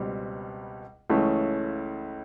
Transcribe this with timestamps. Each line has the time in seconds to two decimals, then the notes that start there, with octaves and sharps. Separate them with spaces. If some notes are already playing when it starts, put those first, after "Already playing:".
Already playing: C#2 B2 G3 C4
1.10 C#2 C#3 E3 A3 C#4